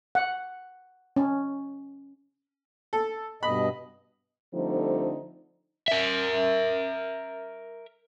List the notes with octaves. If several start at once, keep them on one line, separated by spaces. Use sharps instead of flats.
F#5
C#4
A4
G2 B2 D#5 B5
D3 F3 G3 A3 C4 D#4
A#4 E5